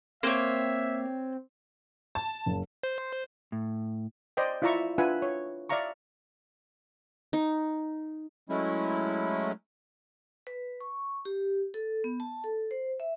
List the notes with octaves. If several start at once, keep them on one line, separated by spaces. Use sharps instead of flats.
A#3 C4 C5 C#5 E5
A5
F#1
C5
A2
C5 D5 D#5 G5
E4 F4 D5 E5 A#5 C#6
D4 F4 B4 E5 F#5 G#5
C#5
D5 E5 F5 A#5 C#6
D#4
F#3 G#3 A3 C#4 E4
B4
C#6
G4
A4
B3
A5
A4
C5
E5